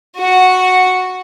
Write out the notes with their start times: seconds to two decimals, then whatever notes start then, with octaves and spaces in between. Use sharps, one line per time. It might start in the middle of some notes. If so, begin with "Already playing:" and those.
0.17 F#4 F#5